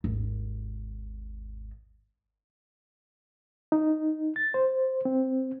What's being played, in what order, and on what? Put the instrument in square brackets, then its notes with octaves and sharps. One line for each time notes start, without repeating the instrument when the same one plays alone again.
[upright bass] G#1 D#2
[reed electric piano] D#4
A6
C5
C4